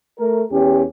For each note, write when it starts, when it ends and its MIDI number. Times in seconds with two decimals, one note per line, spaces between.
0.19 0.43 57
0.19 0.43 70
0.51 0.82 40
0.51 0.82 61
0.51 0.82 67